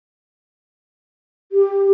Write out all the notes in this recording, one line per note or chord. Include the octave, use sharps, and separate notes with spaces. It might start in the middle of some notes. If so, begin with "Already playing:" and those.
G4